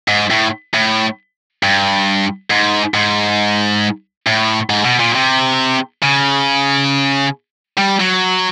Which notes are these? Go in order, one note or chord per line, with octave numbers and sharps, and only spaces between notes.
G#2
A2
A2
G2
G#2
G#2
A2
G#2
B2
A#2
C3
C#3
G3
F#3